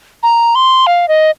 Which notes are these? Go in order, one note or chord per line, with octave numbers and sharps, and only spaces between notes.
A#5
C6
F5
D#5